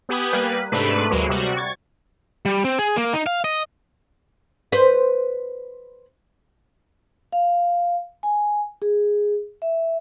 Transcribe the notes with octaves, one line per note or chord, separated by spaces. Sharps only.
B3 G4 G#5 B5 D#6
G3 A#3 B4
G#2 C3 A3 D4 B4
D2 F#3 G#3 A#3
C3 G3 F#4
C#6 G#6 A6
G3
C4
G#4
A#3
D#4
F5
D#5
B4 C5
F5
G#5
G#4
E5